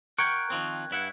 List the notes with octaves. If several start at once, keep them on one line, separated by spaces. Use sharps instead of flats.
A#4 F#5 G5 C#6 F#6 G#6
D#3 F3 C4
G2 E4 F#5